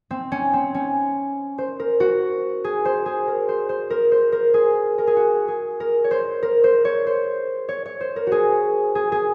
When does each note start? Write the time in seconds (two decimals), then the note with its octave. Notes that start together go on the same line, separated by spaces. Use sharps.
0.11 C4
0.32 C#4
0.53 C4
0.75 C#4
1.58 C5
1.80 A#4
2.00 F#4
2.64 G#4
2.85 C5
3.06 G#4
3.27 A#4
3.49 C5
3.69 C5
3.90 A#4
4.12 C5
4.32 A#4
4.54 G#4
4.98 A#4
5.07 G#4
5.16 F#4
5.48 G#4
5.80 A#4
6.04 C#5
6.11 C5
6.43 A#4
6.64 C5
6.85 C#5
7.07 C5
7.69 C#5
7.86 C#5
8.01 C5
8.16 A#4
8.27 F#4 G#4
8.95 G#4
9.12 G#4